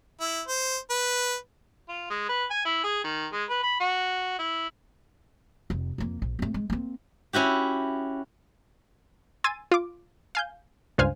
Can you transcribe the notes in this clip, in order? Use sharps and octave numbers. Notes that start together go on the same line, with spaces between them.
E4
C5
B4
F4
G#3
B4
G#5
E4
G#4
D#3
G#3
B4
B5
F#4
E4
F1
F2 A#3
A#1
A3 C4
G#3
A#3 C4
C#4 E4 F#4 G4
G#5 C6 E6 G#6 A6 D#7
F4 D6
F5 G#5 G6
C#2 G2 C5 F5 G#5 F6